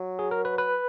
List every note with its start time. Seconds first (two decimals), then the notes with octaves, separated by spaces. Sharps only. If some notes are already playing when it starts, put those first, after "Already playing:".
Already playing: F#3
0.19 G#4
0.31 A#4
0.45 B4
0.58 B4